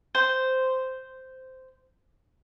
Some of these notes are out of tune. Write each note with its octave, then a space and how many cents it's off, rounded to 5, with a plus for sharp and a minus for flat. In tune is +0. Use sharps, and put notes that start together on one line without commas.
C5 -10